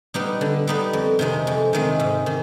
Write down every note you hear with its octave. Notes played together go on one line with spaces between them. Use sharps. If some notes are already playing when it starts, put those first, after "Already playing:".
G3 B3 D#4 B4
D3
G3 B3 D#4 B4
F2
C3 D#3 G#3
F2
C3 D#3 G#3
G#2
D#3